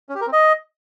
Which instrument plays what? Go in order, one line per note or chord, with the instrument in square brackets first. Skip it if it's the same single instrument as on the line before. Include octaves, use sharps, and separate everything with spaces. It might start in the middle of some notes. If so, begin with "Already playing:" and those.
[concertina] C#4
G4
A#4
C4
D#5